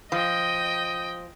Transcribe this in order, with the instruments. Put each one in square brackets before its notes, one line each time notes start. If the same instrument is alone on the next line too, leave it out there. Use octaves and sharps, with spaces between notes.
[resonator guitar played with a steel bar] F3 [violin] D#5 G5 [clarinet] D#6